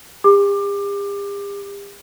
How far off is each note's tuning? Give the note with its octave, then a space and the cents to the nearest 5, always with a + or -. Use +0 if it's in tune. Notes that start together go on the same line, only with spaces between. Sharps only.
G4 +45 D6 +25